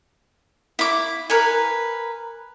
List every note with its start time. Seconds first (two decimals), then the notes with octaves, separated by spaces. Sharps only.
0.79 E4 D6
1.30 A#4 B4 G#5